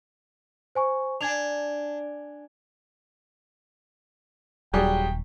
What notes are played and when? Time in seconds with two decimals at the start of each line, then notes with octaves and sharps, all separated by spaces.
0.75 C5 G#5 C#6
1.21 D4 G#5 G#6 F7
4.73 D#1 F#3 G3 G#4 G5